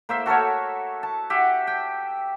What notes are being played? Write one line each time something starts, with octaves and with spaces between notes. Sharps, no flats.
A#3 C5 E5
F#4 A4 A#4 C#5
A5
G4 E5 F#5
G5